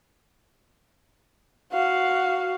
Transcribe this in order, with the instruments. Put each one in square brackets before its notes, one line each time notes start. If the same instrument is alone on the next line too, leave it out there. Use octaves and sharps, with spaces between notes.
[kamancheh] F#4 F5